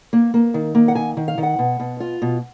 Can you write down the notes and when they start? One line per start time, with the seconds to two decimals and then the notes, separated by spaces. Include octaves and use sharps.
0.13 A#3
0.34 A#3
0.54 D#3
0.75 A#3
0.88 F#5
0.95 D#3 G#5
1.17 D#3
1.28 F5
1.38 D#3
1.43 F#5
1.59 B2
1.80 B2
2.00 F4
2.22 B2